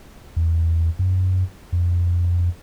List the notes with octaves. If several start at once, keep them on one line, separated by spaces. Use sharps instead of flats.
E2
F#2
F2